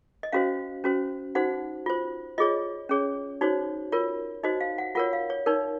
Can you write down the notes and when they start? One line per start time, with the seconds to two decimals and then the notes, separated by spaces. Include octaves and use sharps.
0.23 D#5
0.32 C#4 F#4 C5 F5
0.84 C#4 F#4 C5
1.35 D#4 F#4 C5 F#5
1.86 F4 C5
2.38 F4 G#4 C#5 D#5
2.89 C#4 G#4 C#5
3.41 D#4 F#4 C5 C#5
3.92 F4 A#4 C#5
4.43 D#4 F#4 C5 D#5
4.61 F5
4.78 F#5
4.95 F4 A#4 C#5 F#5
5.13 F5
5.30 C#5
5.46 D#4 A#4 C#5